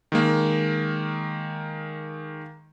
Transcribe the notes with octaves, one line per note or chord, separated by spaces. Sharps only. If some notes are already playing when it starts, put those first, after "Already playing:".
D#3 G#3 A#3